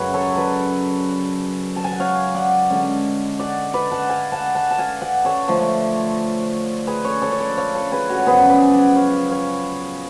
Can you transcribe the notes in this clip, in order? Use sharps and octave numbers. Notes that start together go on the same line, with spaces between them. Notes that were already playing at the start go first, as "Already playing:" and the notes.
Already playing: F#2 C#3 F#3 C#4 B4
A4 C#5
B4 D5
A5
G#5
F#5
C#5 F5
D5 F#5
D3 G#3 C#4
D5 F#5
B4 D5
F#5 A5
F5 G#5
F#5 A5
F#5 A5
A5
F5 G#5
D5 F#5
A4 C#5
D3 F3 A3 D4
G#4 B4
A4 C#5
A4 C#5
C#5
B4 D5
C#5 F5
A4 C#5
G#4 B4
F#4 A4
C#5
F#2 C#3 F3 B3 G#4 B4
B4 D5
G#5
D5 F#5
C#5 F5
C#5 F5